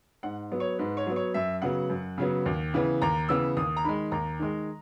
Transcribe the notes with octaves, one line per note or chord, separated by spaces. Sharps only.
G#2 F#5
F#3 B3
C#5
G#2 B4
C#5
F#3 B3
C#5
F#2 E5
C#3 F#3 B3 F#5
F#2
C#3 F#3 B3
D#2
C#3 E3 B3
D#2 A#5
C#3 E3 B3 E6
D#2 D#6
A#5
D#3 G#3 B5
D#2 A#5
D#3 G#3